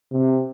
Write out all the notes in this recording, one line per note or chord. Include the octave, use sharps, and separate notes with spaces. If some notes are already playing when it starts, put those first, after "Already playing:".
C3